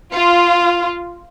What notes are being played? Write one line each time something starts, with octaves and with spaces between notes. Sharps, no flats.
F4